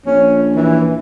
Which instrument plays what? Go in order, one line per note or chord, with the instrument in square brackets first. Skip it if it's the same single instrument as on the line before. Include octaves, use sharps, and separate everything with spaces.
[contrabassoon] A#1 [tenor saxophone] C#4
[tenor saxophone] E3